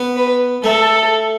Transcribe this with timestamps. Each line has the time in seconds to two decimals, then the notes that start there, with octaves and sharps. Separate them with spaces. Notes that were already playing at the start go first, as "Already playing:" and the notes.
Already playing: B3
0.16 B4
0.64 A3 A4